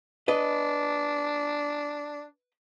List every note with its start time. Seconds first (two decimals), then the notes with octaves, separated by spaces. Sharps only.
0.28 D4 B4 D#5